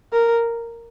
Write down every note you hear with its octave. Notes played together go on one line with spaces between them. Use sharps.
A#4